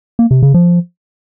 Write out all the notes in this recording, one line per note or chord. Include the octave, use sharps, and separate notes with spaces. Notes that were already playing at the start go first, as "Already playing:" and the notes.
A#3
C3
C#3
F3